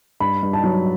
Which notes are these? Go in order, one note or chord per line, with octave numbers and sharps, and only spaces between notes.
G2 B5
G2
A5
F#3